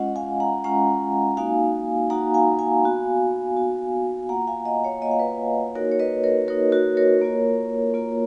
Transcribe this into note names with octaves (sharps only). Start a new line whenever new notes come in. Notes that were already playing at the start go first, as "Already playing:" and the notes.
Already playing: G#3 C#4 F4 D#5 F#5
F5 G#5
F#5 A#5
G#3 C#4 F4 F#5 A#5
A#3 D#4 F#4 F5 G#5
A#3 D#4 F#4 F#5 A#5
F5 G#5
F5 G#5
B3 F#4
B3 F#4
A#3 F4 F#5 A#5
F5 G#5
D#5 F#5
C#5 F5
A#3 F4 D#5
F5
B4 D#5
A#3 D#4 F#4 A#4 C#5
C#5
B4 D#5
A#4 C#5
A#3 D#4 F#4 A#4 C#5
F#4 A#4
A#4 C#5
A#3 F4
A#3 F4